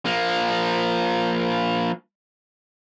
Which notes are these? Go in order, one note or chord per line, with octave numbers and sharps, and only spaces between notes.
F3 A#3